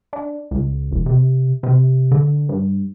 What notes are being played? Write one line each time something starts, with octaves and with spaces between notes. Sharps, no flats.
D4
C#2
E1
C3
C3
D3
G2